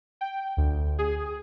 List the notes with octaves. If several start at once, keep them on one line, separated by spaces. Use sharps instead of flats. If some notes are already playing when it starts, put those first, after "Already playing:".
G5
D2
G#4